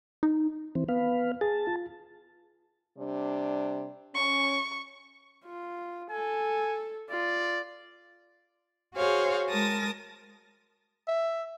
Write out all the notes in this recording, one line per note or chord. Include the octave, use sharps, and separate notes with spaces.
D#4
E3 C4
B3 B4 F5
G#4 A5
F4
C3 G3 D4
C#4 C#6
F4
A4 G#5
F4 D5
F#4 G#4 C5 C#5 F5
G#3 A#4 A5 D#6 A#6
E5